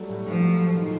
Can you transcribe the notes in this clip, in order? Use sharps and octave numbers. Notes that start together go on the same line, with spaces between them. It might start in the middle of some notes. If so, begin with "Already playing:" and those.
Already playing: F#3 G3 A3
A2
A2 F3
F#3
A3
D#3